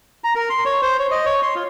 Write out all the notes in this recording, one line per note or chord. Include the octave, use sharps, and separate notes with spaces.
A#5
A#4
C6
C#5
C5
C#5
D#5
C#5
C6
F4